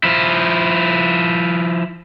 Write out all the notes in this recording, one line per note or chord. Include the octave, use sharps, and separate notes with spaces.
F3 E4